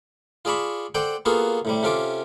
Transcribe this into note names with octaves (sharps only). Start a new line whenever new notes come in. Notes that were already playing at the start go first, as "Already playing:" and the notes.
F4 G#4 D5 A5 B5 C#6
A4 C5 D5 F#5 G5
A#3 B3 F4 F#4 G#4 A4
A2 C3 G3
C3 C#4 F4 A4 D6